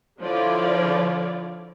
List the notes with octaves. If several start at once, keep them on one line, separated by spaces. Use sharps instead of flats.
D3 F3 E4 F4 C#5 D5